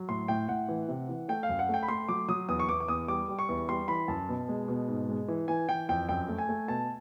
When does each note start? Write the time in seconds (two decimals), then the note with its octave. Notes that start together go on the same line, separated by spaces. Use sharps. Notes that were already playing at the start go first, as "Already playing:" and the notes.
Already playing: F#3
0.09 A2 C6
0.28 A2 G5
0.48 A2 F#5
0.68 E3
0.88 C3
1.09 E3
1.28 A3 G5
1.43 F5
1.49 F#2
1.59 F#5
1.69 A3 G5
1.83 B5
1.88 A3 C6
2.09 F#3 D6
2.29 F#3 D#6
2.48 E2 D#6
2.59 C#6
2.68 E2 D6
2.80 D6
2.88 E2 D#6
3.08 G3 D6
3.29 G3
3.39 C#6
3.49 E2
3.69 G3 C6
3.88 E3 B5
4.08 F#2 A5
4.29 B2
4.49 G#3
4.68 B2
4.88 G#2
5.09 G#3
5.28 E3
5.48 E3 G#5
5.69 E3 G5
5.89 F2 G5
6.09 F#2 G5
6.28 A3
6.38 G#5
6.49 A3
6.68 B2 A5